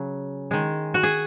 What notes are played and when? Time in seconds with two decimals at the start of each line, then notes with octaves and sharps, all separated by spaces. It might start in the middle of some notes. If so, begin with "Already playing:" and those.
Already playing: C#3 F#3
0.51 D#3 G#3
0.94 F#4
1.03 G#4